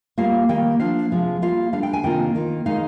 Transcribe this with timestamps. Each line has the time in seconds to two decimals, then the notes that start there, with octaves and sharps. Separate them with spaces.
0.18 G3 A#3 F4 F5
0.49 D#3 G3 A#3 G5
0.80 F3 A#3 D4 F4 F5
1.11 C3 F3 G#3
1.42 G3 A#3 F4 F5
1.73 D3 G3 D4 F5
1.83 G5
1.93 G#5
2.03 C3 D#3 A#3 D4 F4 G5
2.35 D#3 A#3 F4
2.66 D#3 G#3 D#4 F5